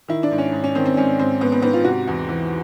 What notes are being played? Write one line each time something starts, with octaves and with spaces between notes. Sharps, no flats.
D#3 E4
D4
G#2
C#4
G#2
C#4
D#3 C4
C4
G#2 C#4
G#2 C4
G#2 B3
B3
G#2 B3
F4
C3 F#4
E2
E3